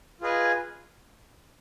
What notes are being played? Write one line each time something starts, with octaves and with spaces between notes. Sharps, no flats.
F4 G#4 B4 D#5 G#5